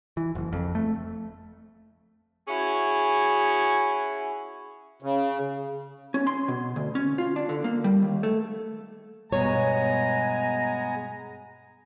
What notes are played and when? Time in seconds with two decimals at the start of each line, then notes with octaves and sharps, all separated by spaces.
0.17 E3
0.35 F#1
0.53 F2
0.75 A3
2.47 C#4 E4 F#4 G#4
5.02 C#3
6.14 C#4
6.27 C6
6.48 B2
6.76 D2
6.95 C#4
7.18 F4
7.36 D4
7.49 D3
7.64 A#3
7.84 G3
8.02 D#2
8.23 A3
9.33 G2 B2 G#3 B3 C#5 G#5 A#5